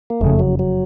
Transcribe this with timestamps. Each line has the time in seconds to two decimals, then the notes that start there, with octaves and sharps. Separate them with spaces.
0.10 A#3
0.21 F#1 F2 C#3 A3
0.39 F#3
0.59 F#3